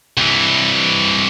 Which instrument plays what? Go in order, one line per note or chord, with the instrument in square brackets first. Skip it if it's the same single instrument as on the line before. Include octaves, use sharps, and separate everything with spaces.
[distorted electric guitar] C2 E3